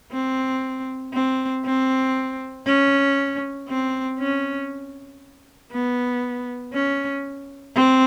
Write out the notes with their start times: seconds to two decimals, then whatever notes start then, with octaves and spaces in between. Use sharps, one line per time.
0.12 C4
1.13 C4
1.65 C4
2.66 C#4
3.68 C4
4.19 C#4
5.72 B3
6.73 C#4
7.75 C4